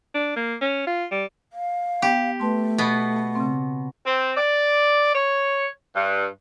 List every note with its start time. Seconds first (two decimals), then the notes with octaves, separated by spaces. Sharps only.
0.14 D4
0.36 A#3
0.61 C#4
0.87 F4
1.11 G3
1.53 F5
2.02 B3 G4
2.40 A3 B4 A5 C6
2.78 B2 B3
3.35 C#3 C4
4.05 C4
4.36 D5
5.14 C#5
5.95 G2